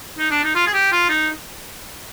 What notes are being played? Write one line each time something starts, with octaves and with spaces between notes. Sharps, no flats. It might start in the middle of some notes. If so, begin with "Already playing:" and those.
D#4
D4
D#4
F4
G#4
G4
F4
D#4